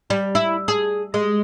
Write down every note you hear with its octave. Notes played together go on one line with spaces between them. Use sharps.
G3
E4
G#4
G#3